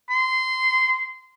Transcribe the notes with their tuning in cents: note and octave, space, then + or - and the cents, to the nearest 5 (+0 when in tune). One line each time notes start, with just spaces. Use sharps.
C6 -20